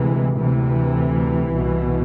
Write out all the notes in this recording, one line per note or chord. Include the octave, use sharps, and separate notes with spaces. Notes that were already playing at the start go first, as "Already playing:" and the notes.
Already playing: D2 C3 E3 G#3
D2 C3 E3
C2 B2